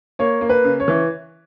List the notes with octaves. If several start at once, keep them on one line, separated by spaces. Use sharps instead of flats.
A#3 C#5
A#3
B4
C#3
C#5
E3